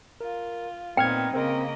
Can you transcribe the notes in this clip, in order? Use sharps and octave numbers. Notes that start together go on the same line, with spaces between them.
F4 A#4
A#2 B3 C4 D#4 G5 F6 G#6
C#3 A#3 C4 A#4 C5 D#5